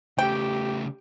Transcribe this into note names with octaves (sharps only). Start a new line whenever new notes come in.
C#3 A3 G4 G5